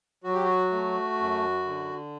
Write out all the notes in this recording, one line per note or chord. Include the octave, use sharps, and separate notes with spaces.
F#3 F#4
G4
F#4
A3
F#2
D3